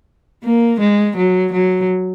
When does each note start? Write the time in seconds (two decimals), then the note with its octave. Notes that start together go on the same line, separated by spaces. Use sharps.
0.44 A#3
0.81 G#3
1.17 F#3
1.53 F#3